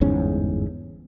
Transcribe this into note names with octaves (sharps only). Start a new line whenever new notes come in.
G1 E2 G#2 C#4